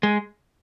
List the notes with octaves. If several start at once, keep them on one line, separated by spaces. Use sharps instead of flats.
G#3